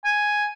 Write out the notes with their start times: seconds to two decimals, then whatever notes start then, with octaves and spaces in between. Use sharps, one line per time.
0.05 G#5